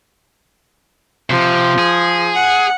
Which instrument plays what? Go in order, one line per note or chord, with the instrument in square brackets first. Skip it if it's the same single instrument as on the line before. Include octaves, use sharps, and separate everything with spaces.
[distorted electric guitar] C3 [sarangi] F3
[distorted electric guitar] G#4
[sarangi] F#5